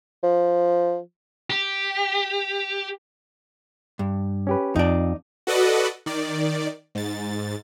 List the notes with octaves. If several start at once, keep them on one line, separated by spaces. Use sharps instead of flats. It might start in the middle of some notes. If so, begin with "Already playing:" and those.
F3
G4
G2
C#4 G4 B4
F2 D#4 D5
F#4 A4 B4 D5 D#5 F#5
D#3 D5
G#2 A6